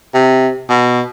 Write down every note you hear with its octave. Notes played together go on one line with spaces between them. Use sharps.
C3
B2